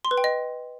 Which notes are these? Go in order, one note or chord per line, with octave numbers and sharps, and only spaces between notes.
C6
B4
G5
D#5